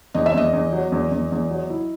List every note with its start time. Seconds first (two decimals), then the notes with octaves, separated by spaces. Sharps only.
0.14 E2 D#5
0.26 E5
0.34 E2 D#5
0.53 E2
0.73 F#3
0.92 E2
1.12 E2
1.32 E2
1.50 F#3
1.70 E4